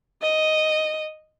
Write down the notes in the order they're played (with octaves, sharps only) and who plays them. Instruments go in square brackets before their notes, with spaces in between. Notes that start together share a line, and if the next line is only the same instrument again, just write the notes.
[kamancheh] D#5